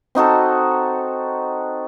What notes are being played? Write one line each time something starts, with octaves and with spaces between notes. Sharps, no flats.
C4 D#4 F#4 A4